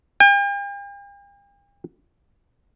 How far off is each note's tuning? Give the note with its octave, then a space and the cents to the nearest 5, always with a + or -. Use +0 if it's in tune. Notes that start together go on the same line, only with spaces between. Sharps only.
G5 +45